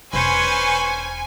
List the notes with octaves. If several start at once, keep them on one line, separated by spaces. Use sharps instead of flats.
E1 C#4 B4 C5 G#5 C#6